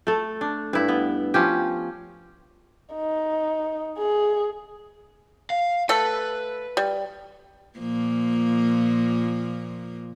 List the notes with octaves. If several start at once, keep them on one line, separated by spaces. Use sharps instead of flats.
A3 A4
D4
G2 E4
B3
F3 C#4 G4
D#4
G#4
F5
A3 A4 B4
G3
A#2 F3 A#3